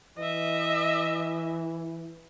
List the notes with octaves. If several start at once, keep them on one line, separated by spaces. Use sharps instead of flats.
E3 D#5 E5